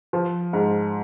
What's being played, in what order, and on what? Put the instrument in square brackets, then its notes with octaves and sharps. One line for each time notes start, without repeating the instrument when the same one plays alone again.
[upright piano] F3
G#2